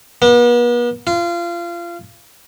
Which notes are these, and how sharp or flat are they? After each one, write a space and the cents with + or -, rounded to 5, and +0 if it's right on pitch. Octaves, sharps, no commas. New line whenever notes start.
B3 -40
F4 -25